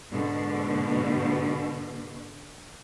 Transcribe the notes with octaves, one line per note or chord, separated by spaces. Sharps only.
G#2 B2 D3